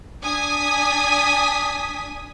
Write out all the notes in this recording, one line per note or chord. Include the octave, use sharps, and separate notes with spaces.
D4 G#5 D#6 B6